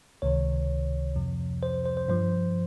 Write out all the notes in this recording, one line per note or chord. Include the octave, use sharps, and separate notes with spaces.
C#2 C3 D#3 C#5
F2 C3 F3
C5
C5
C5
G2 F3 C5